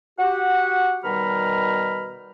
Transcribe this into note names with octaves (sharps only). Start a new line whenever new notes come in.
F#4 G4 F#5
B2 D#3 G3 A#5 B5 F6